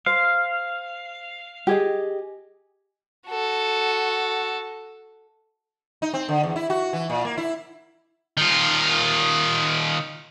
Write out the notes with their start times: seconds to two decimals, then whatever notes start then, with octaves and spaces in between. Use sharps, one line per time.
0.06 C5 F5
1.67 G4 G#4 D#5
3.28 F#4 A4
6.02 D#4
6.14 C4
6.29 D3
6.43 E2
6.56 E4
6.70 F#4
6.93 E3
7.10 A#2
7.25 A#3
7.37 E4
8.37 D#3 F4